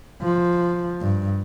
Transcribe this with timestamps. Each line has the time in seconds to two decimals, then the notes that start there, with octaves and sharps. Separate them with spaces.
0.22 F3
1.01 G2